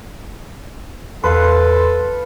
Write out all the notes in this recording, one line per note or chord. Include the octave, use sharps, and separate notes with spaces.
E2 A4 B4 F5 C6